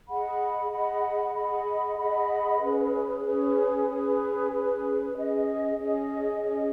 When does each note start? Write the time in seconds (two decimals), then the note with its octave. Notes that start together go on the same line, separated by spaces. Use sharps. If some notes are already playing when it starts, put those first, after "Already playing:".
0.08 G#4 D#5 F#5 B5
0.70 G#4 D#5 F#5 B5
1.33 G#4 D#5 F#5 B5
1.97 G#4 D#5 F#5 B5
2.60 C#4 G#4 B4
3.23 C#4 G#4 B4
3.88 C#4 G#4 B4
4.51 C#4 G#4 B4
5.13 C#4 G#4 D#5
5.77 C#4 G#4 D#5
6.40 C#4 G#4 D#5